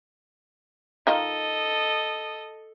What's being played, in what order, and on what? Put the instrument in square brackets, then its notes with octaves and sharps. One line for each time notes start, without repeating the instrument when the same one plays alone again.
[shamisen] D#3 D#4 F4 [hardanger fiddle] A4 D#5